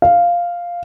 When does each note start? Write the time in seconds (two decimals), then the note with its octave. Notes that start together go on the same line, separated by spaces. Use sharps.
0.02 F5